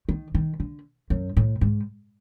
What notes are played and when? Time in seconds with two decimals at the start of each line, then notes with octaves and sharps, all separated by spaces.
0.09 D#3
0.35 D#3
0.60 D3
1.10 F#2
1.37 A2
1.61 G#2